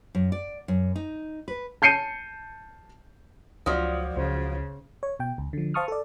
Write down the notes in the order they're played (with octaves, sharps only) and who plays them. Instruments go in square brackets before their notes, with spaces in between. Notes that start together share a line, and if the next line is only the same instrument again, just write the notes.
[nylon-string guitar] F#2
D5
F#2
D#4
B4
[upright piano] A5 G6 C7 C#7 D#7
[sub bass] C#2 [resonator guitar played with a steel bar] F3 F#3 [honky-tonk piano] F4 D5 D#6
[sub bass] C#2 [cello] C#3 [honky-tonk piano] C5
[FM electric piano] C#5
B2 G5
C#2
D3 F3
C5 F5 A5 C#6 D#6 F6
A4 D5